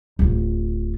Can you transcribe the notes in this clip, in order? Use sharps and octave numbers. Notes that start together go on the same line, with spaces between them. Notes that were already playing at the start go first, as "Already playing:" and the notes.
D1 F4